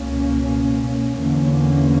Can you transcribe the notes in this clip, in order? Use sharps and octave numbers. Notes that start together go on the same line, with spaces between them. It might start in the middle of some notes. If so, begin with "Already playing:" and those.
Already playing: C#2 B2 A#3 C#4
E2 D3 A#3 C#4